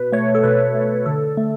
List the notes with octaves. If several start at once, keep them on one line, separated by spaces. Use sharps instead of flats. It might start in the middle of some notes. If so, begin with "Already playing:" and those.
Already playing: B2 B4
A3 C#5
A4
B2 B4
A3
D3 A4
A3